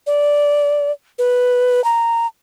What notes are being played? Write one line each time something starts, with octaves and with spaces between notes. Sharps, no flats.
D5
B4
A#5